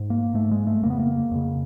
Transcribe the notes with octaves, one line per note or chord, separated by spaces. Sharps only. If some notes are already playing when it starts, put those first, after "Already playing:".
Already playing: G#2
A#3
G#2 A3
G#3
A3
F2 C#3 A#3
B3
A#3
F2 C#3